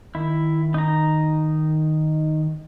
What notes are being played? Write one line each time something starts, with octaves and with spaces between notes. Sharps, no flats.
D#3 E4
D#4 A#5